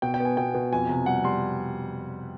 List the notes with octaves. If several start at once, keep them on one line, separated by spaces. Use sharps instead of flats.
B2 G5
G5
B3
G#5
B2 G5
B2
F2 G#5
C3
G3 F#5
G3 C6